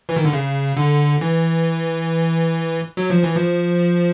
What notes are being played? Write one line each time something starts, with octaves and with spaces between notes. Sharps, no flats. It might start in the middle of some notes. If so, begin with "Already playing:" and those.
E3
D#3
D3
C#3
D3
E3
F#3
F3
E3
F3